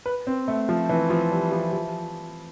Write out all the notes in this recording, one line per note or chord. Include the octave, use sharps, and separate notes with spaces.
B4
C4
A3
F3
E3
F3
G3
F3
F3